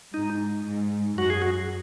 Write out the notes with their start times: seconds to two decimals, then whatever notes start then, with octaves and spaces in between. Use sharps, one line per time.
0.13 G#2 D#4
0.66 G#2
1.18 F#2 F#4
1.30 G#4
1.42 F#4